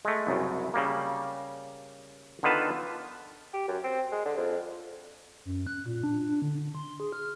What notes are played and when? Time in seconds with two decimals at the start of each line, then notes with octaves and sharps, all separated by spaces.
0.05 G#3 A3
0.27 C2 F#2 C#3
0.74 C#3 G3 A#3
2.43 D3 D#3 B3 F4 B4 A5
3.53 G4
3.68 F#2
3.84 C4
4.12 G#3
4.25 D3
4.38 F2
5.45 F#2
5.67 F#6
5.86 A#2
6.04 D4
6.28 D4
6.42 D3
6.75 C6
7.00 G#4
7.13 F6